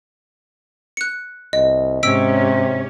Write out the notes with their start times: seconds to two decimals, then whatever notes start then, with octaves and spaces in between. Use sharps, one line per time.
0.97 F#6 C#7
1.53 C2 D#5
2.03 G#2 C3 C#4 G4 E6 B6 D7